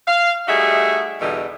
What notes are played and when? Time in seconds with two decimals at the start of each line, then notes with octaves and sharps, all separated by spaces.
0.07 F5
0.48 G3 A3 D#4 F#4 G#4 E5
1.21 E2 B2 D3 E3 G3 D#4